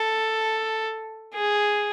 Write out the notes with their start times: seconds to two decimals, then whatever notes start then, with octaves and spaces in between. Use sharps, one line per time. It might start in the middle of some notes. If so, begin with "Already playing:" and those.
Already playing: A4
1.34 G#4